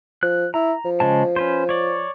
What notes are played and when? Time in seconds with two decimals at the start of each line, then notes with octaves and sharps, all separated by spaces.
0.23 F3 F#6
0.54 E4 A#5
0.85 F3
1.00 C#3 G#3 A5
1.36 C#4 B4 C5
1.69 C#5 D5